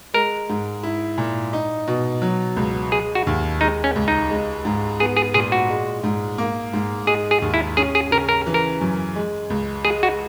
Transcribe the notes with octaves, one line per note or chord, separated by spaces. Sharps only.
G#3 A#4
G#2
E4
A#2
D#4
B2
F#3
C#2
G#3 G#4
F#4
D#2
G#3 D#4
C#4
C#2
D#4
G#3
G#2
B3 G#4
G#4
A#2 G#4
F#4
G#3
G#2
A#3
G#2
G#3 G#4
G#4
D#2
E4
C#4 G#4
G#4
C#3 A#4
A#4
E3
A#4
F#2
G#3
C#2
G#3 G#4
F#4